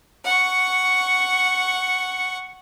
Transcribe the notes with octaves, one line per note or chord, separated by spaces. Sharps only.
F#5 C#6